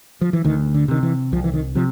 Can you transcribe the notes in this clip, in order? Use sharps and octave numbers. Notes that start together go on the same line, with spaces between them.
F3
E3
D2 D#3
D3
C3 D#3
E3
C2 F3
E3
D#3
C3 F3